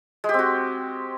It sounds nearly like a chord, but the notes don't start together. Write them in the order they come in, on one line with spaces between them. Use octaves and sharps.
G#3 G4 C4 F#4